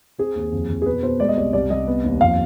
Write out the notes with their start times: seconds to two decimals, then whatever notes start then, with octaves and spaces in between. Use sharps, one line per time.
0.19 C4 G#4
0.35 D#2
0.52 F2
0.69 F2
0.82 G#4
0.86 B2 B4
1.03 B2 C5
1.20 G#3 D5
1.29 D#5
1.37 C2 D5
1.53 C2 D5
1.70 C2 D#5
1.87 B3
2.04 D#2
2.21 F2 F5